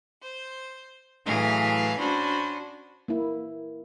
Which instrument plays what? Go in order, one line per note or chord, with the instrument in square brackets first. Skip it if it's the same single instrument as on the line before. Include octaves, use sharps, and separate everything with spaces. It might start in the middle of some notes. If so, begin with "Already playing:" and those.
[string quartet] C5
A2 E3 F#3 G#4 F5
C#4 D4 F#4 C5 B5
[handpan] A#3 E4